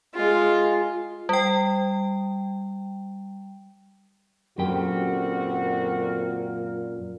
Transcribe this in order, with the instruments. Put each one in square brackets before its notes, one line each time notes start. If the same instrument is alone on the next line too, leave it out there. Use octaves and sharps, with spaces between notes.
[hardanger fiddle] G#3 F4
[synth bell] G3 G5
[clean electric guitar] F#2 G4 G5 [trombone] A#2 [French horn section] D3 C4 F#4 [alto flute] A#4